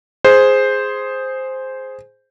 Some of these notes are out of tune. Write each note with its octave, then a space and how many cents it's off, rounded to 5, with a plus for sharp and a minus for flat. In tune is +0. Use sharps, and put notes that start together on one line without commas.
G#4 +0 C5 +0